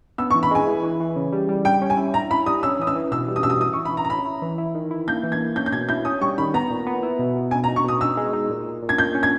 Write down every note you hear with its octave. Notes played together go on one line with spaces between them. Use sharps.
B3 E6
C#6
E3
B5
G#3 G#5
E3
E3
E3
C#3
G3
G3
G3 G5
C#4
G#5
E4
E4 A#5
E4 B5
G3 D#6
C#4 E6
E3 D#6
E6
E3
B2 E6
G3
D#6
B2 E6
D#6
E3 D#6
C#6
E3
B5
E3 A#5
A#5
C#4 B5
E4
E3
E4
D#3
E4
A#3 G6
E3
G#6
A#3
C#4 G6
G6
B2 G#6
E4 G6
C#4 D#6
G3 C#6
D#3 B5
B3 A#5
A#2
B3
E4
B2
B2
B2 G#5
A#5
D#4
C#6
B2 D#6
D#4 E6
G#3
D#4
A#2
A#2
A#2
G#6
A#2 G6
C#4
G#6